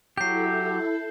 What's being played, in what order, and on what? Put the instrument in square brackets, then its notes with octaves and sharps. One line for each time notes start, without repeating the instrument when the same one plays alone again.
[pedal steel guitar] F#3 G4 [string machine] E4 A4 [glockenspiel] G6 C7